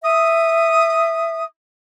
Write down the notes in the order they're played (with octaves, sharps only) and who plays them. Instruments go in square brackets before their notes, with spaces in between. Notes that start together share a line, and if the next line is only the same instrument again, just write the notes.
[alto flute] E5 [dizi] D#6